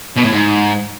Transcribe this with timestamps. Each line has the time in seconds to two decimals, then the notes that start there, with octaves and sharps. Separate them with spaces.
0.16 B2
0.24 A2
0.32 G#2